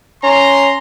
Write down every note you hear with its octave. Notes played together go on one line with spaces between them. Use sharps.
C#4 A#5 C6